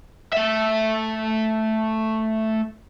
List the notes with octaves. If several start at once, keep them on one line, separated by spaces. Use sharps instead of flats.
A3 E5